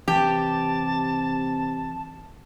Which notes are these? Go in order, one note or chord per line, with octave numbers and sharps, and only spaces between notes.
C3 E3 G4 A5